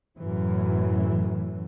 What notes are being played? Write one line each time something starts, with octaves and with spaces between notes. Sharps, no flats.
F#2 A2 E3